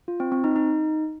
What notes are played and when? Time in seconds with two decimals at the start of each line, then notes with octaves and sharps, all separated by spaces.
0.08 F4
0.20 C4
0.32 C4
0.44 D#4
0.56 D#4